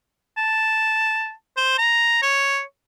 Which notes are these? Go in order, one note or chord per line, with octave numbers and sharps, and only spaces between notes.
A5
C5
A#5
C#5